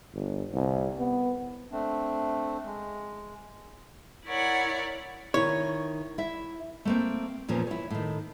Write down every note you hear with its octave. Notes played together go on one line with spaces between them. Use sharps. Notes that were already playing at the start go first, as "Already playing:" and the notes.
G1
C2
B3
A3 C4 D4
G#3
E4 A#4 C#5 D5 F#5
D#3 E4 C#5
E4 E5
A3 A#3 C4
E2 A#2 F3 C#4 A#4
E4 C#5
A2 D#3